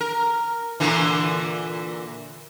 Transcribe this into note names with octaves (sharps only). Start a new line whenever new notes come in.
A#4
A#2 D3 E3